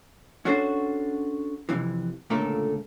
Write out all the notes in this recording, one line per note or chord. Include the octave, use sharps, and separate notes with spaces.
C#4 D4 F#4 A4 C5
F2 C3 E3
C#2 A#2 D3 A3 A4 A#4